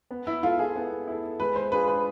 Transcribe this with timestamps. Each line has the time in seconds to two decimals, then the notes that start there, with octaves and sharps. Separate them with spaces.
0.11 B3
0.27 E4
0.43 E4 F4 A4
0.59 G#4
0.76 B3
1.08 E4 A4
1.40 G#3 B4
1.56 C5
1.72 D4 F4 G#4 B4
1.88 B4